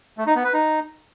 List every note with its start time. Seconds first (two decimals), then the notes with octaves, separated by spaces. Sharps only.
0.18 A3
0.27 D#4
0.35 B3
0.44 B4
0.53 D#4